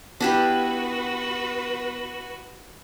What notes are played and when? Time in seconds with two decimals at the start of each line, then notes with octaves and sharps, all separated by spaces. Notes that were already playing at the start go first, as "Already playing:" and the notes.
0.20 B3 D4 E4 F#4 G4 B4